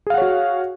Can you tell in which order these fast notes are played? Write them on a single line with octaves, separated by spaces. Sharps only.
G#4 F5 F#5 C#5 F#4